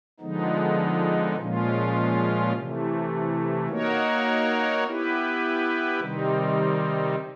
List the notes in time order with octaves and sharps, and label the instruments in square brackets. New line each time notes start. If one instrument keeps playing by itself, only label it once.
[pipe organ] D3 F3 G#3 B3 D#4
A#2 F3 G#3 C#4 F4
C3 E3 A3
A#3 D#4 F#4 A#4 C#5
B3 E4 G4 B4
C3 D#3 G3 C4 D#4